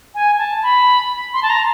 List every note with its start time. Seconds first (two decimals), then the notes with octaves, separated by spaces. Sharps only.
0.15 G#5
0.38 A5
0.63 B5
1.34 C6
1.43 A5
1.50 A#5